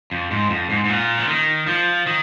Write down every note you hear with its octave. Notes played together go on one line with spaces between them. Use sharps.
F2
G#2
F2
G#2
G#2
A#2
F3
D#3
F3
D#3